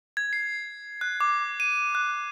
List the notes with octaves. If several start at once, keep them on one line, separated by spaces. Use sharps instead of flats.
G#6
C7
F#6
D6
D#7
F#6